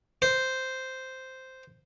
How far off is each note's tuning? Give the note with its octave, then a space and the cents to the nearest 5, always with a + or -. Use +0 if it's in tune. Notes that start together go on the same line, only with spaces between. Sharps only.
C5 -5